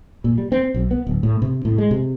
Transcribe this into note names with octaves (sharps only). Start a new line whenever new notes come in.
A#2
G3
C4
B1
B3
D1
A2
C3
A2
G#3
C3